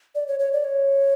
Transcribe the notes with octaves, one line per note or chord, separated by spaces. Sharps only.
D5
C#5
C#5
D5
C#5